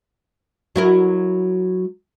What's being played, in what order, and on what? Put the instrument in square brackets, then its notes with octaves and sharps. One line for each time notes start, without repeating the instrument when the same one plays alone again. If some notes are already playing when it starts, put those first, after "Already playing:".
[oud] F#3 E4 A#4